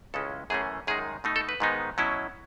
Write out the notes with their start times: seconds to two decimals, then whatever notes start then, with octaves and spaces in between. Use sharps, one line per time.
0.14 C#2 C#3 G#3 C#4 E4 A4
0.50 F#2 E3 A3 C#4 G#4
0.87 F#2 D#3 G#3 D#4 G#4
1.24 B2 A3 D#4
1.36 A4
1.49 B4
1.60 G#2 D#3 G#3 B3 D#4
1.98 B2 F#3 C#4 E4